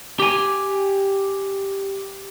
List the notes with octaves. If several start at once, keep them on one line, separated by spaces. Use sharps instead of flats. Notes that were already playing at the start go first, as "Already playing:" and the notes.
G4 G#5